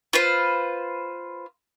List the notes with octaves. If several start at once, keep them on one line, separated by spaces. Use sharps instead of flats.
F4 B4 C5